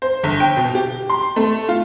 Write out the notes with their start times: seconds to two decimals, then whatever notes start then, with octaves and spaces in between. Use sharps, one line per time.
0.02 C5
0.24 G1
0.40 G5
0.57 B2
0.75 G4
1.10 C6
1.36 A3
1.69 F4